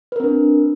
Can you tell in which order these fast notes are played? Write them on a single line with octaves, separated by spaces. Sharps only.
B4 A#4 C4 D4